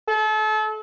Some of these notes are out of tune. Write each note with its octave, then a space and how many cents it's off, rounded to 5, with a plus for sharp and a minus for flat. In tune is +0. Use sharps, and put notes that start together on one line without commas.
A4 -35